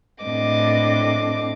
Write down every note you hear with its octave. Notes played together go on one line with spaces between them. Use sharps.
A2 C4 D4 D#5 D6